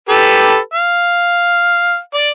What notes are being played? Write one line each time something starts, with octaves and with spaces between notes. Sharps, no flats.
G4 A4 B4
F5
D5